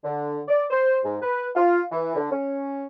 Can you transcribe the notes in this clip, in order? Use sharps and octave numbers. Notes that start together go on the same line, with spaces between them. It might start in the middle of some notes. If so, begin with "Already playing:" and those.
D3
D5
C5
G#2
B4
F4
E3
D3
C#4